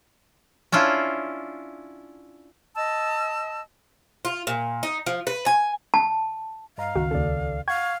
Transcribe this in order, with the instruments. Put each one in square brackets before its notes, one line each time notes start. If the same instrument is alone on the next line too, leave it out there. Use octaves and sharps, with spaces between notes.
[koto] C#4 D4 E4 F4
[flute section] D#5 A5 E6
[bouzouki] F4
A#2
D#4
F3
B4
G#5
[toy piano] A5
[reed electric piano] G2 D#5 A#5 [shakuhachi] F5
[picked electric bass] C#2 D#3 [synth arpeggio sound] F#4
[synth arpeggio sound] D#2 C#3 [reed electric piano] A4 D5
[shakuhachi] F5 [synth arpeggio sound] F#5 [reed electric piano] C#6 G#6